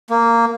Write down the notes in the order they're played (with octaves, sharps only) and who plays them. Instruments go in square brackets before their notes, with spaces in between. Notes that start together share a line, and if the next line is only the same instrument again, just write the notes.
[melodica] A#3